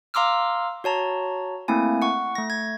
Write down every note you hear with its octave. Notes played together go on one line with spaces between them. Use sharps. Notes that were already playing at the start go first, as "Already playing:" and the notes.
F5 A#5 C6 D6 E6 F6
F#4 C#5 A5 A#5
A3 A#3 C4 E4 G#5
F#5 C#6
A3 A#6
G#6